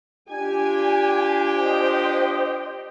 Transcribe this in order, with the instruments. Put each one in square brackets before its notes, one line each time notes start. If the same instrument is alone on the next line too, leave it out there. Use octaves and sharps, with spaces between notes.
[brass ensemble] D4 F4 G4 [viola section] G#5
[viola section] C5 D#5 G5